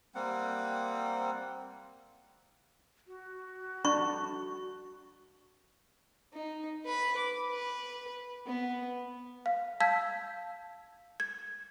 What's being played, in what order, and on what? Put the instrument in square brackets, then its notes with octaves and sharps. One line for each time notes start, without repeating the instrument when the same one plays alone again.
[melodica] G3 A#3 C4 F#5
[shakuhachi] F#4
[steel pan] D4 [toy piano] C#6
[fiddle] D#4
B4 B5
D6
B4
B3
[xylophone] F5
F5 A5 E6 G6 G#6 B6
G#6